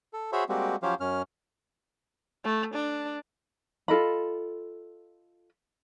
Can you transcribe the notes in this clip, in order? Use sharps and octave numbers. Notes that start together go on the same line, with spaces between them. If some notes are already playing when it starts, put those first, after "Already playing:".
A4
F#4 G#4 C5 C#5 E5 B5
G3 G#3 A#3 C4 F#4 G4
F3 F#3 C#4 G4 C5 F5
F#2 C#4 F6
A3
D4
F4 A4 D#5 B5